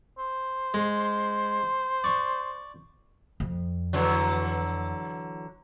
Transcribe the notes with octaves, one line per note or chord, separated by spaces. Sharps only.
C5
G#3
D5 C#6
F2
D3 E3 F#3